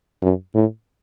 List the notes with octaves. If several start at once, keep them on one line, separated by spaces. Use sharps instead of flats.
F#2
A2